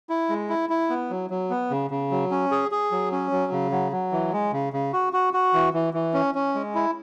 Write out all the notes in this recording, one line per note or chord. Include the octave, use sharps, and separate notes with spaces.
E4
G#3
E4
E4
B3
F#3
F#3
B3
C#3
C#3
F#3
C#4
G#4
G#4
F#3
C#4
F#3
C#3
F#3
F#3
E3
G#3
C#3
C#3
F#4
F#4
F#4
E3
E3
E3
C#4
C#4
G#3
E4